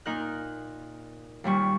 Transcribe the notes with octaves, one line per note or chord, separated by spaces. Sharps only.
A#2 D#4 A#4 F#6
D#2 A#2 G3 C#6